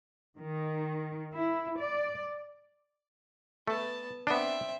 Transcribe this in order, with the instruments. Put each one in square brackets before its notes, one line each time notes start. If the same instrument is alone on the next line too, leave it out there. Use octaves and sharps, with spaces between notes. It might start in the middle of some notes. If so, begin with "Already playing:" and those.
[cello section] D#3
E4
D5
[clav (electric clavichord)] A3 [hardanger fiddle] B3 A5
[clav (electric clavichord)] B3 D4 [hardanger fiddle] C4 E5